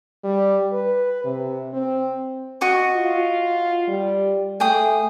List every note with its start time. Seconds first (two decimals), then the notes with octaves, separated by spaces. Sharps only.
0.24 G3
0.73 B4
1.24 C3
1.73 C4
2.61 F#4 D#5 C#6
2.97 F4
3.88 G3
4.60 A3 G#4 G5 D#6